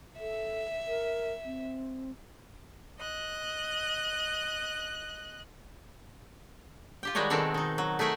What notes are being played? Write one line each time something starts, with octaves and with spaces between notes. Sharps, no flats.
A4 E5
A#4
C4
D#5 F#6
F4 G4 G5
D#3 G3 G#3 F#4 C#5 A#5
B2 D#3 G#3 C4 A4
D#3 D#4
F#3
A3 D#4 G#4 A#4 E5 F#5